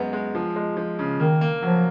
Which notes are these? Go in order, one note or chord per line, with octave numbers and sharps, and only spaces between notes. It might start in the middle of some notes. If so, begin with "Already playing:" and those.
Already playing: F#2 G#3 B3
G#3
F3
G#3
F3
C#3
D#3 A#3
A#3
F3 F#3